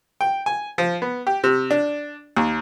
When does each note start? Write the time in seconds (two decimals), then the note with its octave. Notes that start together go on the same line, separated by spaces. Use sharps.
0.21 G5
0.46 G#5
0.78 F3
1.02 B3
1.27 G4
1.44 C3
1.71 D4
2.36 D#2